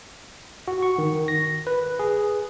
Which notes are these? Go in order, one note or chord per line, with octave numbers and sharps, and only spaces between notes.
F#4
C#6
D#3
A#6
B4
G#4